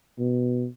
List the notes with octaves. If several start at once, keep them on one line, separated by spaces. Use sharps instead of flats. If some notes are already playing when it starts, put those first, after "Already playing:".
B2